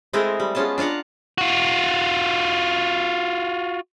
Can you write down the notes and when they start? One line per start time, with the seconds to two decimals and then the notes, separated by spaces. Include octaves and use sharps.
0.13 G#3 A3 C4 E4 A#4 D#5
0.40 G3
0.55 G#3 B3 C#4 F4 A5
0.78 D4 F4 F5 F#5 A#5
1.38 F4 F#4